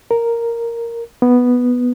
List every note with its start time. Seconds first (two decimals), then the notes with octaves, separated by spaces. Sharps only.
0.11 A#4
1.22 B3